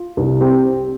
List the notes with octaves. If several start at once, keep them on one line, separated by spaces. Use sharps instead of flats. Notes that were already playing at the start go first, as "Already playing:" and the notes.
Already playing: F4
C2
C4 G4